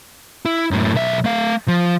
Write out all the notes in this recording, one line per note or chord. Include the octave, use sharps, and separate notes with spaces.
E4
F#2 A2
B1 E5
A3 F5
F3